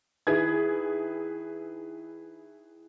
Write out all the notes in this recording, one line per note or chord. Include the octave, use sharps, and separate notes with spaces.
D#3 E4 G#4 B4 G#6